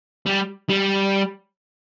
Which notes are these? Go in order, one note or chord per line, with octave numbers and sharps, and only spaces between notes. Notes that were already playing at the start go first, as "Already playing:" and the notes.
G3
G3